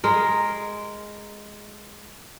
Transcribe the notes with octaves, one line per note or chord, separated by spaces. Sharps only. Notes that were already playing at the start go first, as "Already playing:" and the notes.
G#3 A#4